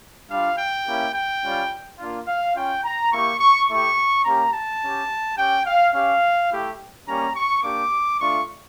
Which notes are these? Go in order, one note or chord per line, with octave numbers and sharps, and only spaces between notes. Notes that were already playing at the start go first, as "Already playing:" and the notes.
G3 D4 F4 F5
G5
A#3 C#4 E4 G4
G5
G3 C#4 F4
A#3 D4 F4
F5
C#4 F4 G5
A#5
A#3 E4 G4 C#6
C#6
A3 E4 G4 C#6
A#3 C#4 G4 A#5
A5
C#4 G4
C#4 G4 G5
F5
C#4 G4 F5
A3 E4 G4
G3 A#3 C#4 G4 A#5
C#6
A#3 D4 G4 D6
A3 D4 F4 C#6